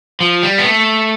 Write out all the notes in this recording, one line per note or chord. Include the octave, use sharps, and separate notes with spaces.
F3
G3
B3
A3